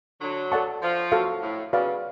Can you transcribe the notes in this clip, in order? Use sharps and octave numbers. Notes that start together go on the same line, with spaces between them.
D3 F#3
A4 D5 F#5 A5 C#6
F3
F#4 A4 F5
A2
C#3 F#4 B4 D5 F5